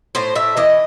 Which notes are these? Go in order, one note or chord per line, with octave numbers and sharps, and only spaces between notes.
A2 C5
A2 E5
E3 D#5